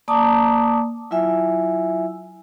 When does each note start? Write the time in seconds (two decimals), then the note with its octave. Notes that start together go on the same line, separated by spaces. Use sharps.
0.08 A#3 D5 A5 A#5 D6 D#6
1.11 F#3 E4 F4 E5 G#5 E6